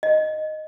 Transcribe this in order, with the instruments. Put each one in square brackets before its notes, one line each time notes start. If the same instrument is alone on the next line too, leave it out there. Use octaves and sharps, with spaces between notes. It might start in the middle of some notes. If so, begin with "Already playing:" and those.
[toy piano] D#5